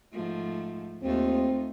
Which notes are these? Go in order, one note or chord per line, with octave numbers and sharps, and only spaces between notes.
G#2 F3 A3
D#2 A3 C4 D#4 F4